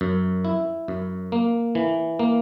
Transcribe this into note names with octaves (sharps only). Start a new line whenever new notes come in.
F#2
E4
F#2
A#3
E3
A#3